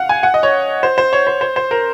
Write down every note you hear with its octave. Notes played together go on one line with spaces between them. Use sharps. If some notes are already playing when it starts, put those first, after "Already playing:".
Already playing: F5 F#5
G#5
F#5
D#5
C#5
C5
C5
C#5
C5
C5
C5
A#4